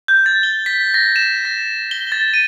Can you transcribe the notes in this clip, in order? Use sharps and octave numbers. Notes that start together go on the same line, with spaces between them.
G6
A6
G7
B6
A#6
E7
A#6
G7
A6
D#7